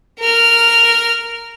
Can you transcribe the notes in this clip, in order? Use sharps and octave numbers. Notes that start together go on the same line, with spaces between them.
A#4 F6